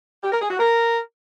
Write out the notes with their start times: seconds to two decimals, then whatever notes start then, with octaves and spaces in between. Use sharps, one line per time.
0.23 G4
0.32 A#4
0.41 G#4
0.50 F#4
0.59 A#4